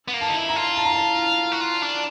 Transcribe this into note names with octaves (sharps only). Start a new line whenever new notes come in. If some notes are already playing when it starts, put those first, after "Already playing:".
B3
A#3
A5
D#4
E4
A#5
F4
A5
A#5
A5
F#4
F4
D4